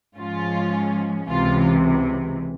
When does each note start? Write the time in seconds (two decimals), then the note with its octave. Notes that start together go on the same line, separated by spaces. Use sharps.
0.17 G#2 F3 G#3 C#4 F4
1.27 C#2 C3 E3 F4